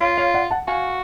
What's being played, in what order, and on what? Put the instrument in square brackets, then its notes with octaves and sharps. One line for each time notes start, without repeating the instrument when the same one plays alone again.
[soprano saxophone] F4 [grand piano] C#5 F5
[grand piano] C#5 F5
D5 F#5
F#5 A5
[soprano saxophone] F#4 [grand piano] F5 G#5